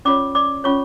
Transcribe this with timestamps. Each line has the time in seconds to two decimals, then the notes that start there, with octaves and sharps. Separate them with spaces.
0.05 C#4 F4 C#5 D5 D6
0.35 D5 D6
0.64 C#4 F4 C#5 C#6